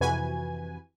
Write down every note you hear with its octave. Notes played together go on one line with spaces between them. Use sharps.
F2 C3 E3 F#4 B4 G#5